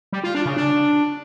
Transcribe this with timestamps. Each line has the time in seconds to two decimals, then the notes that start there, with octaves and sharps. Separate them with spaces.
0.13 G3
0.24 F4
0.35 D4
0.46 C#3
0.57 D4